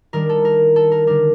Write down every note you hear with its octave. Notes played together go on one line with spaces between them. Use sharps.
D#3 G3 D4 A#4
A4
A#4
A4
A#4
D3 G3 D4 A#4